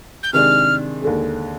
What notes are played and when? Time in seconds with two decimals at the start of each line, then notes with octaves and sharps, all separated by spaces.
0.23 G6
0.33 C3 D#3 G#3 D4 F6
1.02 D#2 D3 G#3